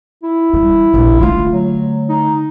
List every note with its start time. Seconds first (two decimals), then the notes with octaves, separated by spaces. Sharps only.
0.23 E4
0.53 E3 G3
0.93 A#1 F3
1.20 D3 A3 F4
1.51 F#3
2.09 D#4